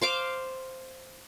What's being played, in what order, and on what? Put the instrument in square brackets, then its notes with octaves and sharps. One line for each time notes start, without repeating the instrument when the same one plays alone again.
[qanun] C5 F5 D6